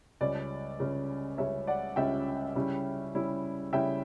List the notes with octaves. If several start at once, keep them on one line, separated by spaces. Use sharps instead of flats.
C#2 C#3 G3 C#4 D5
C#2 C#3 G3 C#4
C#2 C#3 G3 C#4 C#5 E5
D5 F#5
C#2 C#3 G3 C#4 E5 G5
C#3 G3 C#4 E4
C#3 G3 C#4 E4
C#3 G3 C#4 E4 E5 G5